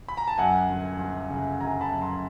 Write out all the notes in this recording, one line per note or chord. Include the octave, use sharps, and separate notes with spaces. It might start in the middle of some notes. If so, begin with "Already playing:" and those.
B5
A#5
A5
F#2 F#5 G#5
G1
G1
C#3
G1 G#5 A#5
A5 B5
F#2
A#5 C6